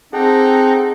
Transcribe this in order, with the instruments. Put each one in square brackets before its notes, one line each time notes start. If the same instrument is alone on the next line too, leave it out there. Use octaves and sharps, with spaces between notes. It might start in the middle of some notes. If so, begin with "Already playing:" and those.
[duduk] C4 [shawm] D#4 [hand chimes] G#4 [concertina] A4 F#5 G5